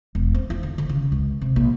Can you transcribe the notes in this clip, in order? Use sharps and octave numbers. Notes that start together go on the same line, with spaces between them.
E1
C4
F4
D3
D3
C#3
C#2
C3
A#1